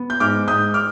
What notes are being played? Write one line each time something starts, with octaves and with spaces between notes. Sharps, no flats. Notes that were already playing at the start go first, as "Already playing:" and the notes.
Already playing: B3
G6
G#2 D6 F6
G#2 D#6 G6
D6 F6